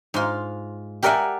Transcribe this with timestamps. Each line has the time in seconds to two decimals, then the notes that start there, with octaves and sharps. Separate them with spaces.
0.14 G#2 F4
1.03 G4 A#4 D5 E5 F#5 G#5